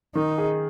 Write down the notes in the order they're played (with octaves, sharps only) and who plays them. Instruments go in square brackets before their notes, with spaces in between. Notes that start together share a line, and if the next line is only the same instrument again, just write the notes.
[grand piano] D#3 [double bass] D#4
[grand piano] G#4